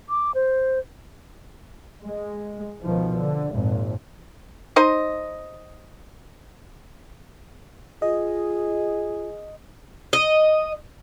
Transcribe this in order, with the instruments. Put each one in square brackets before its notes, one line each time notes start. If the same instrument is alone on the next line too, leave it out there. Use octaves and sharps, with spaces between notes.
[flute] D6
C5
[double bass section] G#3
C#2 B2 D#3 F3
D3
G#1 F2 A#2
[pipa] D#4 C5 D#5
[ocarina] F4 [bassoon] G#4 [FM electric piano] D#5
[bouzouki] D#5